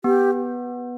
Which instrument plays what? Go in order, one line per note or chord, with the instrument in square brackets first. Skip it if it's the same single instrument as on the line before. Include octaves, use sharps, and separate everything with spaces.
[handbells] B3 [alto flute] G4